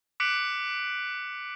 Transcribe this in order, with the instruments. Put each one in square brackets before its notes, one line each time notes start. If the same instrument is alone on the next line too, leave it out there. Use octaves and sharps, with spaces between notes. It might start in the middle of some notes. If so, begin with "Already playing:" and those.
[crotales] D6 F#6 B6 C#7 D7 F#7